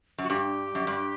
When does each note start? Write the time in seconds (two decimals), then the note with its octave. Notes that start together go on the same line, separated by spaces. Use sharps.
0.18 F#2 F#4
0.29 G2 G4
0.75 F#2
0.87 G2